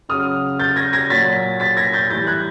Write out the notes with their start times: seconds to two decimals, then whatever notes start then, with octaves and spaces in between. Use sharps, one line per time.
0.09 C#3 F#3 D#6 F6
0.59 G6 A6
0.76 G#6 A#6
0.93 G#6 A#6
1.10 A#2 F#3 A6 B6
1.60 A6 B6
1.77 G#6 A#6
1.94 G6 A6
2.10 A2 E3 G3 G6 A6
2.27 F#6 G#6